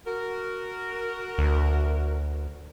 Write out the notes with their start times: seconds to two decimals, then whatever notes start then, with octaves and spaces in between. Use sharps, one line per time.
0.06 F#4 A#4
1.38 D2